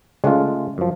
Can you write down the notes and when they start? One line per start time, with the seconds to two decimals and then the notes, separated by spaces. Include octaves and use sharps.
0.24 C#3 G#3 A3 F4
0.78 F#2 F3